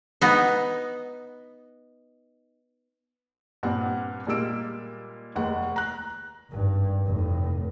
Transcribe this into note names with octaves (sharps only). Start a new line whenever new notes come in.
B3 D#4
G2 A#2 C4 G4 F#5
A#2 G3 G#3 A#3 E6 D7
F1 D#2 G#3 F#5
A#5 F#6
G#1 G2
F1 A2